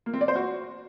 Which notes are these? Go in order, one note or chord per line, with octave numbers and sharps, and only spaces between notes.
A#3
C4
D5
C5
F#4